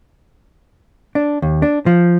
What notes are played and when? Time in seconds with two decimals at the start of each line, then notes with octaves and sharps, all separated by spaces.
1.15 D4
1.42 D#2
1.62 D4
1.86 F3